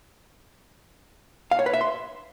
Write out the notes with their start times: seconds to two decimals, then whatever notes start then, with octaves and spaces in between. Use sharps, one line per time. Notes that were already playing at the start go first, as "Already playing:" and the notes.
1.51 F5
1.59 C#5
1.66 B4
1.74 E5
1.81 C6